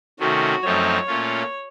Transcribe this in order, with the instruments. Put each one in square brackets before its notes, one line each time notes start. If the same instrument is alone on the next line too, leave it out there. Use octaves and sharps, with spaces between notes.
[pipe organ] C3 D#3 A3 C#4 [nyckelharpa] F#4
[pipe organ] F#2 F3 A3 C4 D#4 [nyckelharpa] C#5
[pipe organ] A#2 A3 C#4 F4